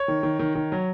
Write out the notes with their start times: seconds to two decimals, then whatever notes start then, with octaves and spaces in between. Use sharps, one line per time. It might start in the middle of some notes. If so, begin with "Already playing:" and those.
Already playing: C#5
0.08 D#3
0.23 D#3
0.39 D#3
0.55 D#3
0.72 F#3